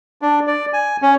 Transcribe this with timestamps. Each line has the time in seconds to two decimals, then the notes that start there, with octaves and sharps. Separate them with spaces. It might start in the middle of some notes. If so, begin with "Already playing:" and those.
0.22 D4
0.47 D5
0.73 G#5
1.02 C#4